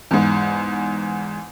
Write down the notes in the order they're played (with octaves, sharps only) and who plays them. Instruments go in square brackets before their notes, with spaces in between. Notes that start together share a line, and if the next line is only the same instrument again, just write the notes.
[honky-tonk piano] E2 G#2